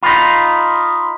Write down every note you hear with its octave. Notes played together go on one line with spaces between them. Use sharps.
D#4 F4 B5 C6 B6